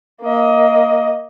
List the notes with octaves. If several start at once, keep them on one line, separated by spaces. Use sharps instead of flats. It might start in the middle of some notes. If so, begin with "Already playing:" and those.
A#3 D#5